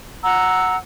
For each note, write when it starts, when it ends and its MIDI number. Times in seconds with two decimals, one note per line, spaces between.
0.23 0.76 78
0.23 0.76 82
0.23 0.76 88